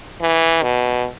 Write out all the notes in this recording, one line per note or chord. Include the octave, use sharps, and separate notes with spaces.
E3
B2